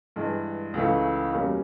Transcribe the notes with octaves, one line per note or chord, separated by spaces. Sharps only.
G2 E3 G#3
C#2 C#3 E3 A3
E2 B2 G3 A#3 C#4